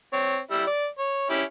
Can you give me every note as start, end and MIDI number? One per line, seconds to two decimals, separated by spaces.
0.13 0.38 60
0.13 0.38 73
0.51 0.64 55
0.51 0.64 64
0.51 0.64 88
0.67 0.87 74
0.99 1.27 73
1.30 1.43 61
1.30 1.43 64
1.30 1.43 67